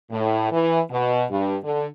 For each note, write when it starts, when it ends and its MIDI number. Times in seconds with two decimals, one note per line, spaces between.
0.11 0.47 45
0.51 0.79 52
0.90 1.24 47
1.31 1.55 43
1.63 1.86 50